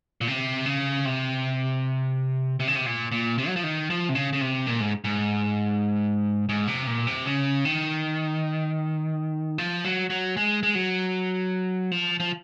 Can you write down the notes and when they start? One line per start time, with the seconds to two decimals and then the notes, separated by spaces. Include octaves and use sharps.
0.21 A#2
0.28 C3
0.66 C#3
1.05 C3
2.60 C3
2.68 C#3
2.76 C3
2.86 A#2
3.12 A#2
3.38 C3
3.47 F#3
3.56 F3
3.63 D#3
3.90 F3
4.09 C3
4.15 C#3
4.33 C#3
4.41 C3
4.67 A#2
4.80 G#2
5.04 G#2
6.49 G#2
6.68 C3
6.87 A#2
7.07 C3
7.26 C#3
7.65 D#3
9.58 F3
9.84 F#3
10.10 F#3
10.37 G#3
10.63 G#3
10.75 F#3
11.91 F3
12.20 F3